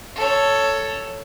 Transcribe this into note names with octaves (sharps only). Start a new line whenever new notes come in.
A4 C#5